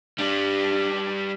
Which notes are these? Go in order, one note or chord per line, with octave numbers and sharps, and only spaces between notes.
G2 G3 D4